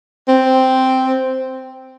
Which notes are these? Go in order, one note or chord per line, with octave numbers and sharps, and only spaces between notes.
C4